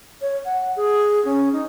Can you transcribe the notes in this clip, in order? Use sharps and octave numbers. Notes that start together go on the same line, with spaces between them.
C#5
F#5
G#4
C#4
D#4